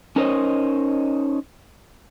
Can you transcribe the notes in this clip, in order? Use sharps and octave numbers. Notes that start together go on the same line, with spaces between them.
C#4 D#4 A#4 C5 C#5 D#5